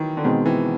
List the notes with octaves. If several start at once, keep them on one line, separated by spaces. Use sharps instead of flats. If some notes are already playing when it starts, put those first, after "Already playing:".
Already playing: D#3 E3 F#3
D3
B2 D#3 G#3 C4
E3